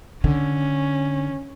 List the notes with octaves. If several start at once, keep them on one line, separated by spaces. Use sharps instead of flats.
D3 C#4